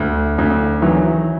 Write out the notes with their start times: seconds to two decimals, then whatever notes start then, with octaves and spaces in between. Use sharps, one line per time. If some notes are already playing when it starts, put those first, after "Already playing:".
Already playing: D2
0.38 D2
0.82 D#3 E3 F#3